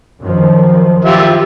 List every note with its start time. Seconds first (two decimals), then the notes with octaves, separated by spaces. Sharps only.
0.22 F#2 D#3 F3
1.05 F4 G4 E5